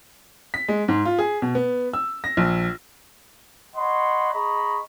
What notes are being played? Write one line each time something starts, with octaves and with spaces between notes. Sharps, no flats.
B6
G#3
G#2
F4
G#4
B2
B3
E6
A#6
A#1
C#5 D#5 F#5 B5 C6
G#4 D#5 A#5 B5 C#6